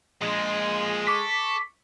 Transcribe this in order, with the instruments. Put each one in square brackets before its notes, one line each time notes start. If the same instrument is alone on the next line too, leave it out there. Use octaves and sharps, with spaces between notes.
[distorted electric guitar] A#2 F3 [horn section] G#3
[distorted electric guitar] A4 [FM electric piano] C#6 D6 B6